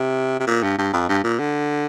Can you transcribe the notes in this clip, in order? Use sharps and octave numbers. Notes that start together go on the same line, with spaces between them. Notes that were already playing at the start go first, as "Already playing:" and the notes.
Already playing: C3
C3
A#2
G2
G2
F2
G2
A#2
D3